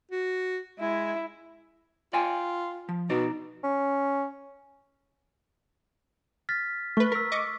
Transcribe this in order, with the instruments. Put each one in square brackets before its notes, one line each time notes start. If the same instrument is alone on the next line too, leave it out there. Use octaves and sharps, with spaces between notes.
[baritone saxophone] F#4
[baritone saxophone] G#3 [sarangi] E4
[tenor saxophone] F4 [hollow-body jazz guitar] D5 G5 G#5
[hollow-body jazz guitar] F3
[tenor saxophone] B2 [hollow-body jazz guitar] D#4 D5
[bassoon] C#4
[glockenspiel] F6 A6 B6
[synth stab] A3 B4 [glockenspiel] C#6
[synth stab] A#4 [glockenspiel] E6 B6
[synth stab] D#5 C#6 D6